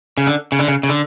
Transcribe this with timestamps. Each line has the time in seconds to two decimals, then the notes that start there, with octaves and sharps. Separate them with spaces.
0.18 C#3
0.27 D3
0.52 C#3
0.59 D3
0.68 C#3
0.83 C#3
0.89 D3